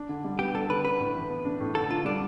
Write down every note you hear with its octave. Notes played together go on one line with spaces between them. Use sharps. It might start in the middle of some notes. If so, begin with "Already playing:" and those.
Already playing: D4
D3
G3
B3 G4
D4 A4
D3 B4
D4 B4
A2
E3
B3
D4
A2
D3 A4
D3 F4
G3 D4